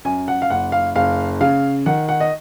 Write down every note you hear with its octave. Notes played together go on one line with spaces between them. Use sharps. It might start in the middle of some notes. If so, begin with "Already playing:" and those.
F#2 G#5
F#5
F5
F#1 F#5
F5
F#1 F5
C#3 F5
D#3 F#5
F#5
D#5